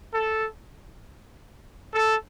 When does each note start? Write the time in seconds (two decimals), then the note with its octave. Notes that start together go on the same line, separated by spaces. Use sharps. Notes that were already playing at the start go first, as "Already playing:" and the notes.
0.14 A4
1.94 A4